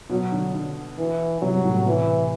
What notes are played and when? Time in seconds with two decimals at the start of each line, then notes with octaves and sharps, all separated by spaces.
0.10 B2 F#3
0.32 D3
0.54 D3
0.98 E3
1.41 C3 F#3
1.53 G2
1.64 A2
1.74 B2
1.86 C3 E3